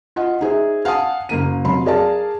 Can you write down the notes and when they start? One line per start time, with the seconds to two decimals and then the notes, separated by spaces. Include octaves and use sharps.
0.16 F4 D#5 F#5
0.41 D#4 G#4 C5 E5
0.85 F5 F#5 G#5 A5 D#6
1.29 F#1 A#3 D#7
1.65 F1 F#3 B5 C6
1.86 G#4 A#4 D5 F5 A5